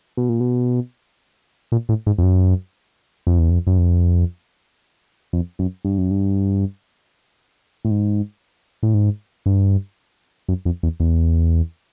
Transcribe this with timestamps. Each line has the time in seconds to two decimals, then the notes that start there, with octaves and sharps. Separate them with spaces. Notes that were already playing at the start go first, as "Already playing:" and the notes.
0.17 B2
0.29 A#2
0.40 B2
1.72 A#2
1.89 A2
2.07 G#2
2.18 F2
2.23 F#2
3.27 F2
3.39 E2
3.50 F2
3.67 F#2
3.78 F2
5.33 F2
5.59 F#2
5.85 G2
5.98 F#2
6.11 G2
7.85 A2
7.91 G#2
8.83 A2
8.94 G#2
9.46 G2
10.48 F#2
10.65 F2
10.83 E2
11.00 E2